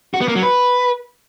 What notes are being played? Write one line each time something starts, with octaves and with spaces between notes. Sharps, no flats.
F#4
B3
A#3
F#3
B4